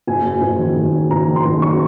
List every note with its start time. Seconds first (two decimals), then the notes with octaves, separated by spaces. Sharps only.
0.07 F#1 G#5
0.25 F#2
0.42 F#1
0.59 D#3
0.76 F#1
0.93 F#2
1.11 F#1 A#5
1.27 D#3
1.36 C6
1.45 F#1
1.62 F#2 C#6